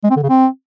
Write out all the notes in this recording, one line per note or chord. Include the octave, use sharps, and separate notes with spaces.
G#3
C4
D3
C#3
C4